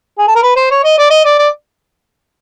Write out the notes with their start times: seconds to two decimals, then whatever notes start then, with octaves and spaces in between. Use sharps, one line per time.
0.18 G#4
0.28 A4
0.36 A#4
0.43 B4
0.56 C5
0.71 C#5
0.84 D#5
0.98 D5
1.11 D#5
1.25 D5
1.39 D5